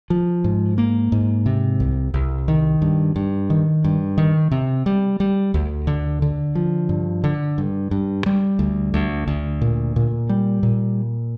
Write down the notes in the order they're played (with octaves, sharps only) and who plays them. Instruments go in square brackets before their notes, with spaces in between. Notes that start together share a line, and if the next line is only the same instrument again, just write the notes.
[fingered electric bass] F3
G#2
A#3
G#2
C3
C2
C2
D#3
G2
G2
D#3
G2
D#3
C3
G3
G3
D2
D3
D3
F3
G2
D3
G2
G2
G3
D2
D2
D2
A#2
A#2
G3
A#2